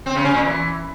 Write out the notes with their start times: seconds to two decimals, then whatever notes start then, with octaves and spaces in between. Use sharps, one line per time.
0.06 C4
0.15 C#3
0.25 C#4
0.34 A#2
0.44 E3